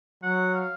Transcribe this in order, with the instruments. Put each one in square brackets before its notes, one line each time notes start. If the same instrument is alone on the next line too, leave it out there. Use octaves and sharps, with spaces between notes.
[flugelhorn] F#3 [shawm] F#5
[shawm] F5